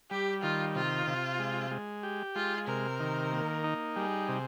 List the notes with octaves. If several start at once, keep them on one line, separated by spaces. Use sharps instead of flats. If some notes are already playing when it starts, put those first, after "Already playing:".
G3 G4
D#3 F4
C3 F4
C3
G#3
G#3
G4
G#3 F4
C3 A#4
D#3
A#3
D#4
G3 G#4
C3